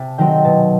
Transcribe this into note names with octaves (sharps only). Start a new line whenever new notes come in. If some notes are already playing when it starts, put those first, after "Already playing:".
Already playing: C3 A5
D#3 F#3 C4 G5
B2 A5